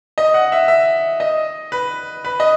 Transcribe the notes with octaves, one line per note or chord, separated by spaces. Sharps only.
D#5
F#5
E5
E5
D#5
B4
B4
D#5